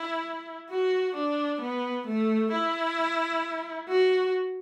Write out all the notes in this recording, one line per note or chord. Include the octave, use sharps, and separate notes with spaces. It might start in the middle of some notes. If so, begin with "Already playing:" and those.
Already playing: E4
F#4
D4
B3
A3
E4
F#4